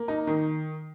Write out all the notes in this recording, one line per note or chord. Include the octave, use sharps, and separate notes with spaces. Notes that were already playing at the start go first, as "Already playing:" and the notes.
Already playing: A#3
D#4
D#3